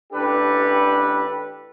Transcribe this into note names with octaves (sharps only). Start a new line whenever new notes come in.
A1 D4 G4 A4 B4